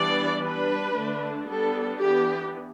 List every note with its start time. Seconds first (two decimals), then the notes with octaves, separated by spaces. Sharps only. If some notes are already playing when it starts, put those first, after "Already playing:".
Already playing: E3 G3 B3 D4 D5
0.43 G3 D4 B4
0.96 D3 A3 D4
1.49 G3 B3 D4 A4
2.02 E3 B3 D4 G4